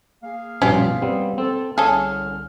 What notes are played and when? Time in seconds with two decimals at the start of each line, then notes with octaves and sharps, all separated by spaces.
0.24 A#3 G#4 F5
0.62 A#1 G2 B2 C#4 F4 G4
1.02 G3 B3 C4
1.38 C4 A4
1.78 C2 D3 C#4 G#4 A4 F6